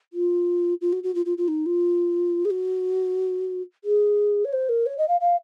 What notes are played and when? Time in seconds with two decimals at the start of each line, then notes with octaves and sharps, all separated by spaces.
0.13 F4
0.81 F4
0.93 F#4
1.04 F#4
1.15 F4
1.26 F4
1.38 F4
1.48 D#4
1.66 F4
2.45 G#4
2.50 F#4
3.84 G#4
4.45 C#5
4.53 C5
4.69 A#4
4.86 C#5
4.98 D#5
5.08 F5
5.21 F5